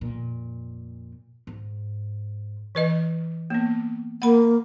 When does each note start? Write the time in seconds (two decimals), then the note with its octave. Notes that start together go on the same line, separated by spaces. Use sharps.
0.01 F2 A#2
1.47 G#2
2.75 E3 B4 D#5
3.50 A#3 B3
4.22 A#3 F#5 B5